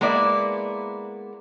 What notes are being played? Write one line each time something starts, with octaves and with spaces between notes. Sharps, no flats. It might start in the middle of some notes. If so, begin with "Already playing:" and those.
G#3 A#3 B3 E4 D5